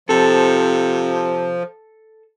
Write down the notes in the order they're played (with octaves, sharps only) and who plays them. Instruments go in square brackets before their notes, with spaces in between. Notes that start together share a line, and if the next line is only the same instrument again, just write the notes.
[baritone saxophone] C3 [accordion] F3 [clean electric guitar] A4